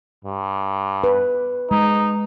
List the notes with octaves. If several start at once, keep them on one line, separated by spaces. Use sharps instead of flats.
G2
B4
G#3 D#4